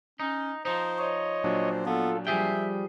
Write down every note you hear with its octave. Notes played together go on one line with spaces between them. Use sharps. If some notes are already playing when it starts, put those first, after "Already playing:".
C#4 D#4
F3 D#4 C5
C#5 D#5
A#2 F#3 D4 C5
B3 F4 A4
F3 G3 G#4 E5 G5